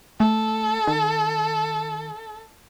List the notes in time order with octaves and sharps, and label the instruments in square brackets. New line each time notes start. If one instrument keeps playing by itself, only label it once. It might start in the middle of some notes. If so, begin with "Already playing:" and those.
[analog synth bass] A3 [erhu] A4
[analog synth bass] D#3